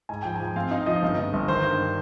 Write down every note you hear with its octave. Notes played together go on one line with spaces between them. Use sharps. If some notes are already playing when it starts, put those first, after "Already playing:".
G#2 G#5
F3 G5
F3 G#5
C4 F5
D#4 F5
F3 D#5
G1
G1
G1
D#3 C5
G2